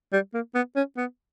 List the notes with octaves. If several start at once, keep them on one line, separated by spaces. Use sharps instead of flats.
G3
A#3
B3
C#4
B3